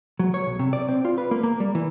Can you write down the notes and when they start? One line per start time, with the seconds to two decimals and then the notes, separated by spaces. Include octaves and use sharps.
0.19 F#3
0.34 C#5
0.47 B1
0.59 C3
0.73 D5
0.89 C4
1.05 F4
1.18 B4
1.31 A#3
1.43 A#3
1.60 G3
1.75 E3